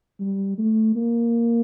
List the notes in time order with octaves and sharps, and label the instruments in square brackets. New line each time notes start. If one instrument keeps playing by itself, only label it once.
[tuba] G3
A3
A#3